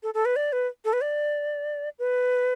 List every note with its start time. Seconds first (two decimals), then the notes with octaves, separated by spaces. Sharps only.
0.03 A4
0.14 A4
0.25 B4
0.36 D5
0.53 B4
0.85 A4
0.93 B4
1.01 D5
1.99 B4